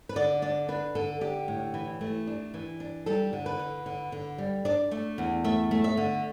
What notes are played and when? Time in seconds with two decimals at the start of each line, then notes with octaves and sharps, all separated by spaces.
0.09 B4
0.16 D3 D5
0.42 D4 D5
0.68 D4 B4
0.95 D3 A4
1.21 D3 G4
1.48 A2
1.74 E3
2.01 A3
2.27 D4
2.54 E3
2.80 D4
3.06 G3 A4
3.33 D3
3.46 B4
3.59 D3
3.86 D3
4.12 D3
4.38 G3
4.65 D4 D5
4.91 A3
5.18 E2
5.44 A3 E5
5.71 A3
5.84 E5
5.97 D3